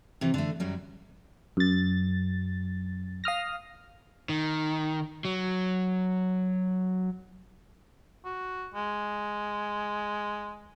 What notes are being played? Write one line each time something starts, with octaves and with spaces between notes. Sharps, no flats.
C3 E3
D3 A3
F#2 F#3 G3
F#2 A6
F5 D#6 F6 A#6
D#3
F#3
F#4
G#3